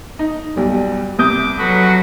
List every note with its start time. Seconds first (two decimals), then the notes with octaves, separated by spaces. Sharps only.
0.19 D#4
0.57 B1 G3
1.19 C2 D6 D#6 G6
1.58 F#3 F#4 A4 B4